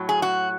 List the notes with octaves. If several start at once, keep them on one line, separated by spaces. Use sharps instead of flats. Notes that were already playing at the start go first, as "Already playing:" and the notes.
Already playing: A2 F#3
G#4
F#4